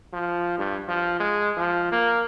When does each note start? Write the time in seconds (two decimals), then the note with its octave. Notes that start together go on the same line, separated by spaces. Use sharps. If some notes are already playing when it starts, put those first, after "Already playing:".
0.13 F3
0.58 G2
0.88 F3
1.20 G#3
1.57 F3
1.92 A#3